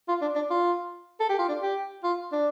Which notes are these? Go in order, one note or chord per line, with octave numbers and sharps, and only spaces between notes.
F4
D4
D4
F4
A4
G4
F4
D4
G4
F4
D4